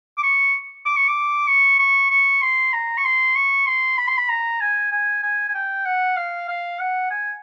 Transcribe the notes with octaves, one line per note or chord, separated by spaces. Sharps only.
D6
C#6
D6
C#6
D6
C#6
C#6
C#6
C6
A#5
C#6
C6
C#6
C6
B5
C6
B5
A#5
G#5
G#5
G#5
G#5
G5
F#5
F5
F5
F#5
G#5